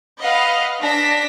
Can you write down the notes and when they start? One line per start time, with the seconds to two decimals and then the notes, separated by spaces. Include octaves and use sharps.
0.22 B4 D#5 F5 F#5
0.81 D4 A#6 B6